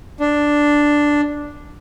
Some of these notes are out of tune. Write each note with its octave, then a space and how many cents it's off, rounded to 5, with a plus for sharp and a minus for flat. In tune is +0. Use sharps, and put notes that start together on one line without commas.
D4 +0